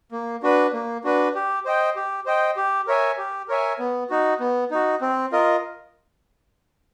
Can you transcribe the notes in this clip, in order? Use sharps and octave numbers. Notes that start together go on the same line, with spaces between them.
A#3
D4 F#4 B4
A#3
D4 F#4 B4
G4
C5 D#5 G5
G4
C5 D#5 G5
G4
A#4 C#5 E5 G#5
G4
A#4 C#5 E5 G#5
B3
D#4 F#4
B3
D#4 F#4
C4
F4 A#4 D#5